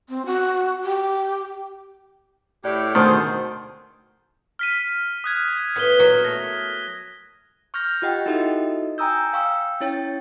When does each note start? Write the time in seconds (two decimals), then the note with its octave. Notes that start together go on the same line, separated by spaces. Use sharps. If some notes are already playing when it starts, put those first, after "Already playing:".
0.09 C4
0.26 F#4
0.84 G4
2.65 A2 G4 D5
2.95 D2 B2 D#3 A3 G#4 C5 A5 C6
4.59 F6 B6 D#7
5.24 D#6 F#6 G#6
5.76 A2 B3 B6 G7
5.99 A#2 F#3
6.24 A3 A#6
7.74 C#6 F6 G6 A#6
8.02 F4 G4 D#5 F#5 G5
8.26 D#4 E4 F#4 A4 D#5 E5
8.98 G5 G#5 A#5 D#6 E6 G6
9.33 F5 G5 C#6 E6
9.80 C#4 E4 C#5 G5 A6